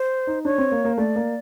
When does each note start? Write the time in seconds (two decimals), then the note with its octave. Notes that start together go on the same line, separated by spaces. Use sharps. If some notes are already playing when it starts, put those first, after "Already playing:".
Already playing: C5
0.27 D#4
0.45 D4 C#5
0.58 C4
0.72 A#3
0.85 A#3
0.98 A3 D5
1.16 A#3